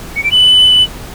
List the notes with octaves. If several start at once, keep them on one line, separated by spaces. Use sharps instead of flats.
C#7
D7
F#7